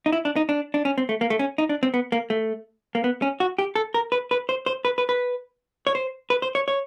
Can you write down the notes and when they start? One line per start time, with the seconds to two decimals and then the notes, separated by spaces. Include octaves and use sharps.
0.06 D#4
0.12 E4
0.25 D4
0.36 D#4
0.49 D4
0.74 D4
0.85 C#4
0.98 C4
1.09 A3
1.21 A#3
1.30 A3
1.39 C#4
1.58 D#4
1.69 D4
1.83 C4
1.94 B3
2.12 A#3
2.30 A3
2.95 A#3
3.04 B3
3.22 C#4
3.40 F#4
3.58 G4
3.75 A4
3.94 A#4
4.12 B4
4.31 B4
4.49 C5
4.66 C5
4.85 B4
4.98 B4
5.09 B4
5.87 C#5
5.95 C5
6.30 B4
6.42 C5
6.55 C#5
6.68 C#5